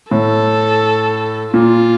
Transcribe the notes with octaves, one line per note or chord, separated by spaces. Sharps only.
A2 A4
A#2 F4